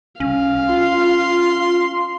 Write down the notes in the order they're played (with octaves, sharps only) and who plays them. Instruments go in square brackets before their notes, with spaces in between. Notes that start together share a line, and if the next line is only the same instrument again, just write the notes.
[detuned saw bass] C2 [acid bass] C#4 [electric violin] F5
[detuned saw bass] F4 [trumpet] C6